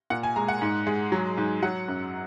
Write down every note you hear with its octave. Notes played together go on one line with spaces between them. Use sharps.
A#2 F#5
G#5
G#3 A#5
F#5
G#2
G#3
F#3
G#2
F#3 F#5
F#2